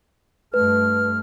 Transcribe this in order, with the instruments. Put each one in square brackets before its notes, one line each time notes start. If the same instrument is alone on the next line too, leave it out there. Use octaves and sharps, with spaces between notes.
[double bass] G2 A3 [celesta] B4 [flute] F6